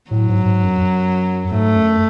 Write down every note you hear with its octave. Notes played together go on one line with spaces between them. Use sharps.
A2 F#3
G#2
G#2
F#2
F#2
G#2 A3
F#2